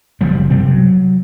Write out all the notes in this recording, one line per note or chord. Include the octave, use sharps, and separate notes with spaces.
F#1 F3 G3
C3 G3 C4
F#3